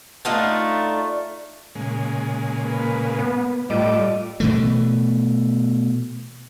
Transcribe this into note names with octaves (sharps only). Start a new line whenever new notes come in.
A3 D4 D#4 F4
A#2 C#3 G#3
A#3 B4
B3
A2 G3 A3 F4 D#5 D6
B2 E3 A3